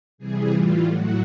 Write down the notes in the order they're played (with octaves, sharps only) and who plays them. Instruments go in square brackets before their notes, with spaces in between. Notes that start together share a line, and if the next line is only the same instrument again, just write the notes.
[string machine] C3 E3 G3 G#4
A2 E3 G3 F4
A2 F#3 F#4